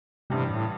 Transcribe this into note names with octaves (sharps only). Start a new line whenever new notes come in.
A1 G2 C3 G3
A2